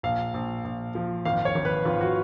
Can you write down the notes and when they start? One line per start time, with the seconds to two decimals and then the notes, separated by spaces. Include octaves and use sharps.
0.03 A#1 F5
0.34 A#1
0.64 A#1
0.95 F3
1.25 G#1 F5
1.45 C#5
1.55 G#1
1.65 B4
1.85 G#1 F4
2.01 F#4